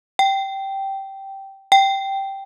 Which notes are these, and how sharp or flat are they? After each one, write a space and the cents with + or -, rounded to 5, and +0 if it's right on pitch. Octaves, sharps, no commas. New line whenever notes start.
G5 -10
G5 -5